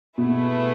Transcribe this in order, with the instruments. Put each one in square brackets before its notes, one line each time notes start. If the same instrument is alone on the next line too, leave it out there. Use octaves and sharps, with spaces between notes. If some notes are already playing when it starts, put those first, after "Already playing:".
[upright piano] B2 [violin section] A3 E4 G#4 B4